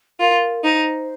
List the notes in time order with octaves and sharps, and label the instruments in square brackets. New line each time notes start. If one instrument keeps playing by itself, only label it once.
[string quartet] F4 [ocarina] A#4
[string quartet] D#4 [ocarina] C5